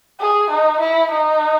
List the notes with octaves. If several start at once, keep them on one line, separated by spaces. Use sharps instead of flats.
G#4
D#4
E4
D#4